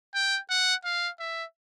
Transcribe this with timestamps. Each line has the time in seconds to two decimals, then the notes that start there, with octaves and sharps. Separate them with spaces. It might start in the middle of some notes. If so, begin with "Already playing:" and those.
0.15 G5
0.50 F#5
0.84 F5
1.19 E5